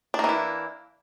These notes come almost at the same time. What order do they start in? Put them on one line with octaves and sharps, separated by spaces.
D4 A#3 E3 E4